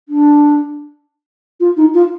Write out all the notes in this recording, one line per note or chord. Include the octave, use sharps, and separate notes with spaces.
D4
F4
D#4
F4